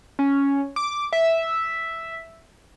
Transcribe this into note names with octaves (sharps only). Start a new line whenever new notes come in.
C#4
D6
E5